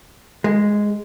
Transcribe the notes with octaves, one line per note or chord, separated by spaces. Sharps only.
G#3